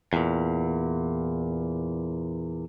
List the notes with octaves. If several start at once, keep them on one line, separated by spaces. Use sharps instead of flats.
E2 A#2